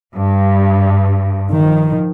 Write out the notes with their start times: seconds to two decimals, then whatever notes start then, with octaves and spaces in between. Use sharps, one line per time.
0.16 G2
1.52 D#3 F3